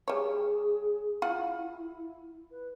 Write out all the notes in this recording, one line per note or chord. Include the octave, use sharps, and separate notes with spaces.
G3 G#4 C#5
E4 F4 F#5
B4